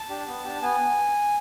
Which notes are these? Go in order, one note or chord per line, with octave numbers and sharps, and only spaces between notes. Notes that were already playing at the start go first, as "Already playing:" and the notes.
Already playing: A5
D4 G4
B3
D4 G4
B3 G#5